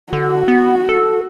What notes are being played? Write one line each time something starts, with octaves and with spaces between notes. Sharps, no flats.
D3 F#4
B3
A4